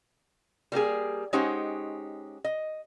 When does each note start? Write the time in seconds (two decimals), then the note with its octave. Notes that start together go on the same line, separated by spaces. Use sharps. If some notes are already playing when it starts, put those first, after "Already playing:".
0.72 G3 A#3 G4 G#4
1.33 G#3 C#4 D#4 G4 C5 F#5
2.44 D#5